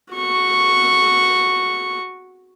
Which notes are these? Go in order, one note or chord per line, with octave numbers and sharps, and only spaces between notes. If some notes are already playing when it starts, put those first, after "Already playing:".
F#4 C#6